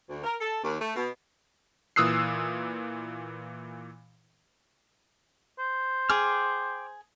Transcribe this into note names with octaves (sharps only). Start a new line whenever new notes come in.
D2
A#4
A4
D#2
A3
B2
A#2 E3 D#6 E6 F#6 C7
C5
G#4 G5 D6 F6